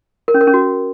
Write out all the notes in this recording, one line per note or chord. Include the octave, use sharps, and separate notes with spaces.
A#4
C#4
A#4
C#4
F#4